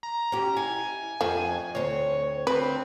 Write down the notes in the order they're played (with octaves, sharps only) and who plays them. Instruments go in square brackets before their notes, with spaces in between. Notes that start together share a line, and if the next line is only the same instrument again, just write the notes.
[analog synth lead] A#5
[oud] C#4 G4
[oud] E4 [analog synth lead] G#5
[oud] F2 [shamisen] F3 A3
[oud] D2 C4 [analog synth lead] C#5
[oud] D2 [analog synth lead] C4 [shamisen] B4